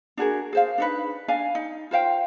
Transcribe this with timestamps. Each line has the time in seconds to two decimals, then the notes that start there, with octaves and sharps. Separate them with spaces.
0.17 D4 F#4 G#4 A#4
0.53 G#4 C5 F5
0.78 D4 D#4 B4
1.28 D4 D5 F5 G#5
1.55 D#4
1.91 F4 C5 F5 G5